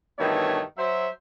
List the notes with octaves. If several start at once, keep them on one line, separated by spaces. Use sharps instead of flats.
G2 B2 D#3 E3 A3 C#5
F#3 C5 E5